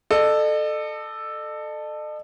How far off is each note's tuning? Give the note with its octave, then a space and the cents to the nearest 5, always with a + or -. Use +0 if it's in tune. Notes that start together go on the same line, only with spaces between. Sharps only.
A4 +0 D#5 -45